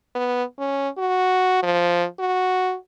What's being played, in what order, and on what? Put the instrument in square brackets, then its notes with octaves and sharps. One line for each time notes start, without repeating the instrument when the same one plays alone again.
[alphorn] B3
C#4
F#4
F3
F#4